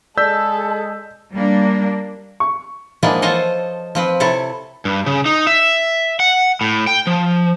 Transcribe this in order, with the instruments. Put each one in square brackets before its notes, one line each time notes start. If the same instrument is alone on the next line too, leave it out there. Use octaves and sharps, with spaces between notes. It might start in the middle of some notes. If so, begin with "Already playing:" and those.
[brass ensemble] G#3 G#4 [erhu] A4 [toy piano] D5 [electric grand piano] E6 G6 B6
[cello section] G3 A#3 D4
[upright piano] C#6
[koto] E3 F3 G#3 A#3 B3 D4
F4 A4 C5 C#5 D#5
F3 C4 B4
C3 E4 A4 C#5
[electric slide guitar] G2
C#3
D#4
E5
F#5
A2
G5
F3